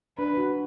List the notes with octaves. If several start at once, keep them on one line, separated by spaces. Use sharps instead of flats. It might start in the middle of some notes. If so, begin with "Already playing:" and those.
D4 B4
F#4